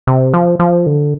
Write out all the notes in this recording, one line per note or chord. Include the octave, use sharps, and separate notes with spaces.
C3
F3
F3
D3